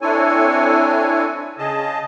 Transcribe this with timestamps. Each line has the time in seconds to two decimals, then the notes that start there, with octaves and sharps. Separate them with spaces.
0.01 C4 D4 E4 A4 C#5 G#5
1.58 C#3 G#4 D#5 A5